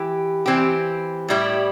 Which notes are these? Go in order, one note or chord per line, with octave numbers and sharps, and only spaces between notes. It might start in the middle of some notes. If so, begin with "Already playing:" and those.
Already playing: E3 G4
E3 C4 G4
A2 G3 E4 G4